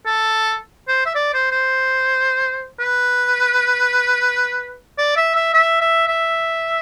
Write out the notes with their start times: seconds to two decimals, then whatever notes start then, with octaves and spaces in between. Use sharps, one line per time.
0.06 A4
0.88 C5
1.06 E5
1.15 D5
1.34 C5
1.51 C5
2.80 B4
4.98 D5
5.16 E5
5.35 E5
5.54 E5
5.81 E5
6.08 E5